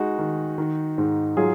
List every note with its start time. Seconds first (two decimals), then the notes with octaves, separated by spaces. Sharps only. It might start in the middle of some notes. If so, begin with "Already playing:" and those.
Already playing: G#3 D#4 F#4
0.19 D#3
0.58 D#3
0.98 G#2
1.37 F#3 F4 G#4